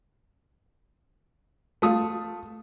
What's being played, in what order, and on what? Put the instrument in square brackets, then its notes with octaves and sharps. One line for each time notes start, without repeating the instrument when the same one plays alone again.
[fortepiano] A3 F4 D#6